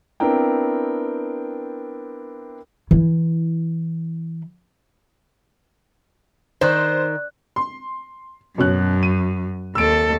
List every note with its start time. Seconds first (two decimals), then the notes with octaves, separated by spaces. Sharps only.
0.20 B3 C4 D4 E4 A#4 G5
2.91 E3 E4
6.61 D#3 C5 D5 F#6
7.56 C6
8.58 F#2 B2 C#4 F#6
9.03 D#7
9.75 D#2 A4 E6 D7